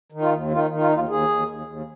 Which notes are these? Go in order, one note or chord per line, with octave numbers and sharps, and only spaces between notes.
D#3
F4
D#2
D#3 F4
D#3
F4
D#4
D#2
F4
D#2 G#4
D#2
D#2
D#2